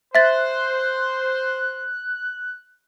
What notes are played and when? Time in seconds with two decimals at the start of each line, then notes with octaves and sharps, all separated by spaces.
0.15 C5 E5 F#6 A6